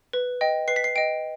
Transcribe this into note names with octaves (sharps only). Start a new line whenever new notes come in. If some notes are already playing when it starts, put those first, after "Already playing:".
B4
D#5 G5
B4 C7
B6
C7
D#5 G5 D7